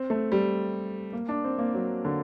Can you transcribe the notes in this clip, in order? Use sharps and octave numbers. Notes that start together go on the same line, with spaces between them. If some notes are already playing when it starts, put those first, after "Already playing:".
Already playing: C4
A3
G3
A#3
D4
C4
A#3
F#3
D3